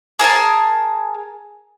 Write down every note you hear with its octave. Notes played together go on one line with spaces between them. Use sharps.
G#4 A#4 G#5 A5